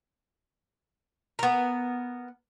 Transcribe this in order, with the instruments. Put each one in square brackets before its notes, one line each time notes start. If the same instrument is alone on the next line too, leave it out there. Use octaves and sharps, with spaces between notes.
[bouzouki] B3 A#4